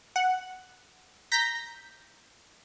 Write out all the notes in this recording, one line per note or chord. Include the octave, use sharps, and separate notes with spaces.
F#5
A#5 G6 A#6 B6